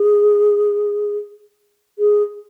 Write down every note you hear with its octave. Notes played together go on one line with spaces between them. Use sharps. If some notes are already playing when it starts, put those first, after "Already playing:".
Already playing: G#4
G#4